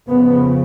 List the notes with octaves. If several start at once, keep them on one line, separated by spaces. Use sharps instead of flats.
F2 C#3 B3